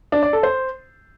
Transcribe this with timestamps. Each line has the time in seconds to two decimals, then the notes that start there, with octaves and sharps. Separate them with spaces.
0.12 D4
0.23 D5
0.33 A4
0.43 C5